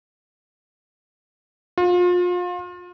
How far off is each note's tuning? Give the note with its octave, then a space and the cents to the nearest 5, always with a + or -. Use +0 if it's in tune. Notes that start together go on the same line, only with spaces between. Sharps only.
F4 +35